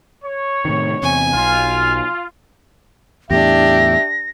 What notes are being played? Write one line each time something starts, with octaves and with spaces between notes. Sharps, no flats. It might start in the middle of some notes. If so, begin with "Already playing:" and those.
C#5
A2 C3 D#3
E2 C3 G#5
B1 F4
E2 A2 D4 G4 E5 A#6